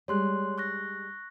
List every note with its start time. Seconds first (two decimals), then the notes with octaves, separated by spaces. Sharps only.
0.08 G3 G#3 C#5 C6 F#6
0.58 C#6 F#6 A#6